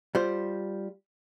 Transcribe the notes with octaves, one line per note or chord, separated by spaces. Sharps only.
G3 F4 C5